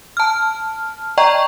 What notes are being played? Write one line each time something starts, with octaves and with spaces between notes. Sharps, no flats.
A5 F6
D5 D#5 G5 A#5 C#6